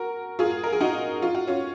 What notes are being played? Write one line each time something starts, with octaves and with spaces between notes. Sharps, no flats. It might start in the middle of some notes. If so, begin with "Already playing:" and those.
Already playing: F#4 A#4
F4 G#4
A#4
G#4
D#4 F#4
F4
F#4
C#4 F4